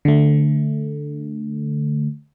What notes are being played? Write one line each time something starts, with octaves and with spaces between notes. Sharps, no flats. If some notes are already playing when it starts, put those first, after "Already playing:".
D3 A3